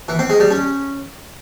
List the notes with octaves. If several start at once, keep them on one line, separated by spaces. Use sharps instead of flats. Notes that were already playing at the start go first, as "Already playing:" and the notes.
E3
C4
G#3
G3
C#4